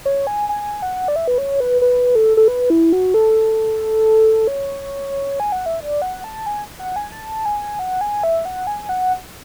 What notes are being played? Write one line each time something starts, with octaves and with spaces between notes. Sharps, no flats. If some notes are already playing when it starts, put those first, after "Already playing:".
C#5
G#5
G#5
F#5
D5
E5
B4
C#5
B4
B4
A4
A4
B4
E4
F#4
A4
C#5
G#5
F#5
E5
D5
F#5
A5
G#5
F#5
G#5
A5
G#5
F#5
G#5
E5
F#5
G#5
F#5